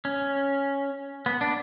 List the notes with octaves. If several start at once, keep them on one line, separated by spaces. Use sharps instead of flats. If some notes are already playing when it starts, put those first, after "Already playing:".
C#4
B3
D4